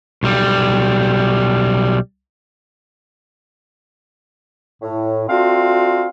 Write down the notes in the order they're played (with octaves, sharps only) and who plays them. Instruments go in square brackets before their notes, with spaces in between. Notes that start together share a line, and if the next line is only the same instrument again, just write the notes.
[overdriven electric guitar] B1 G3
[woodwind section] A2
A3 C4 D4 F4 F#4 F5